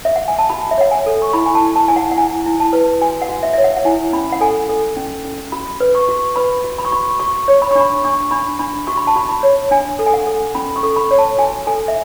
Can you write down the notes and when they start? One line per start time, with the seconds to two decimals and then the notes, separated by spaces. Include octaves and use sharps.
0.05 E5
0.16 F#5
0.28 G#5
0.39 A5
0.50 F#4 B5
0.71 E5
0.78 C#5 F#5
0.91 G#5
1.06 A4
1.22 C#6
1.33 E4 B5
1.46 G#5
1.55 A5
1.61 E4
1.76 A5
1.88 E4 G#5
1.96 F#5
2.11 F#5
2.17 E4 G#5
2.46 E4
2.60 A5
2.73 B4
3.01 F#4 G#5
3.22 F#5
3.29 F#4
3.43 E5
3.53 C#5 E5
3.64 F#5
3.77 F#5
3.85 E4 G#5
4.13 C#4 B5
4.32 F#5
4.41 A4 G#5
4.69 A4
4.96 C#4
5.25 C#4
5.52 F#4 B5
5.80 B4
5.95 C#6
6.08 F#4
6.36 B4 B5
6.64 F#4
6.78 B5
6.85 C#6
6.92 F#4 B5
7.20 F#4 C#6
7.48 C#5
7.62 B5
7.71 C#6
7.75 D4
7.81 B5
8.04 D4 C#6
8.31 D4 B5
8.59 D4 B5
8.87 F#4 C#6
8.97 B5
9.07 A5
9.16 F#4 B5
9.29 B5
9.43 C#5
9.71 D4 G#5
9.99 A4
10.06 G#5
10.14 F#5
10.27 A4
10.55 C#4 B5
10.76 C#6
10.83 A4
10.96 B5
11.11 C#5
11.18 A5
11.38 F#4 G#5
11.67 A4 G#5
11.88 E5